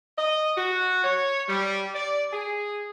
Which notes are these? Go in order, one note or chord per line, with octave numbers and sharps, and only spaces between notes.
D#5
F#4
C#5
G3
D5
G#4